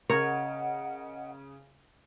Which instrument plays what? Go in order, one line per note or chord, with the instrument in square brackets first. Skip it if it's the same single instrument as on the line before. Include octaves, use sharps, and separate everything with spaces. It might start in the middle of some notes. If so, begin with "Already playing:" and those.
[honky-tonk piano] C#3 [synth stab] A#4 [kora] C#5 [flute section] D#5 F#5